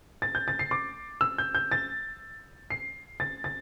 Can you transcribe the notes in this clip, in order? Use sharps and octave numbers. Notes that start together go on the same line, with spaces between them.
A6
G6
A6
C7
D6
E6
G6
G6
A6
C7
A6
A6